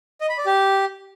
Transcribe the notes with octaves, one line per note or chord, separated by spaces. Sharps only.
D#5
B5
D5
G4